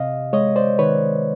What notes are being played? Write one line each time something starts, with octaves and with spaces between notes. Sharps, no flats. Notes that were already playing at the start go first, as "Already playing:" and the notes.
Already playing: C3 D#5 F5
G#3 C#5 D#5
C5 D5
D#3 B4 C#5